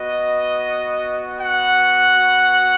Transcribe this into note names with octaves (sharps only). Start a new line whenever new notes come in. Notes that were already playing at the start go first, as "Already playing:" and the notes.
Already playing: B3 F#4 D#5
F#5